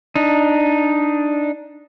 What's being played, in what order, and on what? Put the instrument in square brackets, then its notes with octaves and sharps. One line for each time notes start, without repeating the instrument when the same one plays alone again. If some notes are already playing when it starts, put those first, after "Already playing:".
[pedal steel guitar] D4 D#4